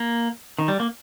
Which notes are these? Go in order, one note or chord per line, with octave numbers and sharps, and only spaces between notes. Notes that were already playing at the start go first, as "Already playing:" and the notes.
Already playing: A#3
D#3
G3
A#3